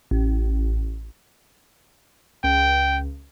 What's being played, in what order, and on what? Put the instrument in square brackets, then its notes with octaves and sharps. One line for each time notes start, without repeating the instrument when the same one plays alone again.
[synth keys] A1
[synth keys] C#2 [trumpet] G5